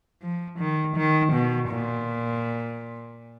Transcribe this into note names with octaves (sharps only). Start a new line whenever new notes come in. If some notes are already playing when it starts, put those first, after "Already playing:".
F3
D#3
D#3
B2
A#2